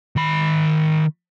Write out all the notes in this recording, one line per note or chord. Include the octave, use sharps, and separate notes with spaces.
D#3 B5